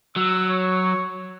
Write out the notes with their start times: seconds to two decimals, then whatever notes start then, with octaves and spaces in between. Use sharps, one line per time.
0.16 F#3 E6
0.49 C#5